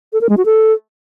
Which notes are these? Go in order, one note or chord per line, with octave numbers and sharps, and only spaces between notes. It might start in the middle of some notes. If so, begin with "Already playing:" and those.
A4
A#4
G#3
F#4
A4